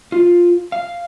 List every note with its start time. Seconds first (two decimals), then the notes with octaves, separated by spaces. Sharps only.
0.12 F4
0.72 F5